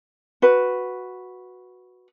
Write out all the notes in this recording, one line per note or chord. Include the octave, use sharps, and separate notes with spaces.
F#4 B4